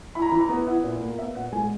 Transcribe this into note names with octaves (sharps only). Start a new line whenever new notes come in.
E4 B5
A#5
B5
E3
A#5
B3
E4 F#5
A#2
A#3
B3 E5
A#2 F#5
G#3 G#5